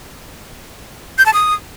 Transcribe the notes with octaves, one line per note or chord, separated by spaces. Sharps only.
G6
A5
D#6